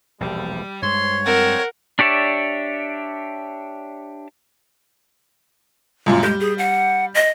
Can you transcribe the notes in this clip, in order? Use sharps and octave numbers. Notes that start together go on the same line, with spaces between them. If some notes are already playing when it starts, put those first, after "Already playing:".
E1 A#1 G3
G2 G#3 C5 C#5 C6
F3 C4 A#4 F#5
D4 G4 C#5 D5 E5
C#2 F#2 A#2
G3 G#3 G6
G#4
F#5
D#5